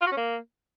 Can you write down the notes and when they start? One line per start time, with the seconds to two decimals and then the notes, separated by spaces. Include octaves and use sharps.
0.01 F4
0.07 F#4
0.12 C#4
0.17 A#3